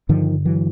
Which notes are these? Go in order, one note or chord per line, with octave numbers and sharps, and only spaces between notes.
G2 D3 D#3 F3
E3 F#3